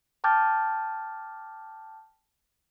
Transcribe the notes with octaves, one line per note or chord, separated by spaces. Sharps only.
G5 A5 D6 F6 G6 A6